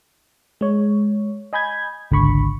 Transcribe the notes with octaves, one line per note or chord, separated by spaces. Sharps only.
G#3 C#5
D#5 G#5 B5 G6 G#6
G#1 C#2 D3 B5 C#6